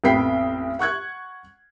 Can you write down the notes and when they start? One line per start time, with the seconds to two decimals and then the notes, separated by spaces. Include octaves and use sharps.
0.04 A1 F2 B3 G5 B6 C7
0.79 F#5 C#6 F#6 G#6